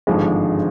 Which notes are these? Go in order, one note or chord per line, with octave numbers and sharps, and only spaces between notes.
G#1 G2 D3 F3 G#3